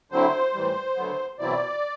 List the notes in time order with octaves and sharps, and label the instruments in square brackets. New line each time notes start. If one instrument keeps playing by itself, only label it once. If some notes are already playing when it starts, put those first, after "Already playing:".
[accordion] D3 F#3 C4 E4 C5
A2 E3 G3
D2 D3 F#3 B3
E2 B2 F#3 C4 E4 D5